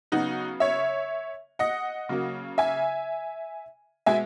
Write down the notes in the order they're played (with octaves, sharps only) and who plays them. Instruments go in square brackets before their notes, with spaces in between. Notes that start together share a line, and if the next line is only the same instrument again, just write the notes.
[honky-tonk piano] C#3 F#3 B3 D#4 F#4
C#5 E5
D#5 F#5
C#3 F#3 A#3
E5 G#5
B2 G#3 B3 E5 G#5